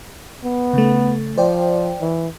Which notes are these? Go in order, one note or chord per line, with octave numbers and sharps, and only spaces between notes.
B3
C#3 A3
F3 C5 D5 G5
E3